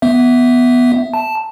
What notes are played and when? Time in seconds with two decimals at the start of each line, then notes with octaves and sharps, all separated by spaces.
0.02 B3 E5
1.14 A5